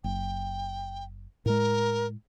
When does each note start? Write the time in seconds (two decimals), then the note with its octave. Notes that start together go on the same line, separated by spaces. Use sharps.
0.04 F#1 G5
1.46 A2 G#3 A#4